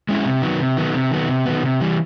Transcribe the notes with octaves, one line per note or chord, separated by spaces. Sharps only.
G#3 C#4 E4
C3
D#3 F#3 B3
C3
D#3 F#3 B3
C3
D#3 F#3 B3
C3
D#3 F#3 B3
C3
E3 G3